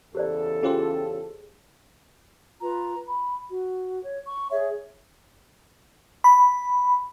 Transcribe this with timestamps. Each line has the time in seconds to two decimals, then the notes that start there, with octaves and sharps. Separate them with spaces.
0.15 E2 C#3 G4 A4 C5 D5
0.63 C#4 F4 G4 G#4 C5 C6
2.62 F4 B4 A#5
3.08 B5
3.50 F#4
4.05 C#5
4.26 C#6
4.51 G#4 C#5 E5
6.24 B5